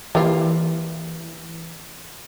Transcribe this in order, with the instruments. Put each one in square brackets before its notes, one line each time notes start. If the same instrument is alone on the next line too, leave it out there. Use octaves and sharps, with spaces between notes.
[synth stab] E3 [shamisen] G3 A#3 F4